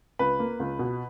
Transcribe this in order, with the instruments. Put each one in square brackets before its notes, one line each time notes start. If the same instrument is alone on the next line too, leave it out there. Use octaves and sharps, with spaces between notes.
[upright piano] C#2 B4
A#3
C#2
B2